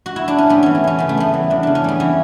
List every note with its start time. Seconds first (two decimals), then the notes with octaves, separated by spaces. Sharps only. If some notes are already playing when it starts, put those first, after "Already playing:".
0.06 F#4
0.16 E4
0.28 D4
0.38 C#4
0.50 G3 B3
0.63 E3 C#4
0.75 A3
0.84 E2 C#4
0.99 C#3 B3
1.09 A3
1.17 G3 B3
1.34 E3
1.50 E2 D4
1.63 C#3 D4
1.75 C#4
1.84 G3 B3
2.00 E3 C#4